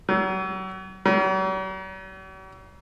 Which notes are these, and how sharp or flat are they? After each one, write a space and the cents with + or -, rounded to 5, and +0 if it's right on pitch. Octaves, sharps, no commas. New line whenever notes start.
F#3 +35
F#3 +45